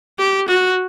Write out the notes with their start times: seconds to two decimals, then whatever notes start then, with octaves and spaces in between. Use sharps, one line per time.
0.19 G4
0.48 F#4